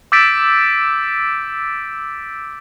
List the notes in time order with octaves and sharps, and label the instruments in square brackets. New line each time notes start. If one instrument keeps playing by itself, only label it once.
[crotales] D6 E6 G6 A6 B6 D7